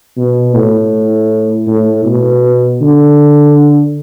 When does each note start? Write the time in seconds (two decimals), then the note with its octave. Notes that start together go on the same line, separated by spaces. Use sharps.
0.17 B2
0.54 A2
1.67 A2
2.05 B2
2.81 D3